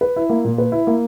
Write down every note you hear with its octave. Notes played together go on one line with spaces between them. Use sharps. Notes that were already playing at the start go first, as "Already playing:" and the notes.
B4
E4
A#3
A#2
B4
E4
A#3